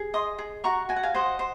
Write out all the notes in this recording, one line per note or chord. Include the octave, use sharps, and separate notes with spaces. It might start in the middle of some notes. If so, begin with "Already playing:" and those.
Already playing: G#4
D#5 C6 D#6
G#4
F#4 A#5 C#6
F#4 G#5
F#5
F5 G#5
C5 D#5 F#5
C5